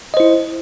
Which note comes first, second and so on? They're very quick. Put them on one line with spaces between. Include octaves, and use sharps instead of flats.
D#5 C5 E4